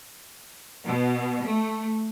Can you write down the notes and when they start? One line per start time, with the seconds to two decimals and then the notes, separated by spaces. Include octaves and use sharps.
0.86 B2
1.45 A3